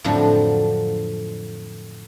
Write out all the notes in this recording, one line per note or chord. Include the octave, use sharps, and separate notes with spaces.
F2 A2 D3 F3 F#3